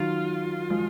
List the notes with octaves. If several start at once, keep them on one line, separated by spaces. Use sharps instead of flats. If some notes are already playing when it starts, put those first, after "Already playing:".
Already playing: D#3 F#3 F4
F3 G#3